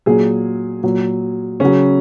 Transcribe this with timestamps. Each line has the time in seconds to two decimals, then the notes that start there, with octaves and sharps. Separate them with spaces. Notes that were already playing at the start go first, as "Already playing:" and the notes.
0.06 A#2 F#3 G#4
0.83 A#2 F#3
1.60 C#3 F#3 C#4